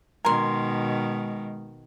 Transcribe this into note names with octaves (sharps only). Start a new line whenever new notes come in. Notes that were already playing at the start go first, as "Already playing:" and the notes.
B2 D#3 G#3 A#4 G#5 C6